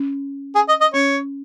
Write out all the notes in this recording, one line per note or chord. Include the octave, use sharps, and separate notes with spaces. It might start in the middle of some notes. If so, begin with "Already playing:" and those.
Already playing: C#4
G#4
D#5
D#5
C#4 C#5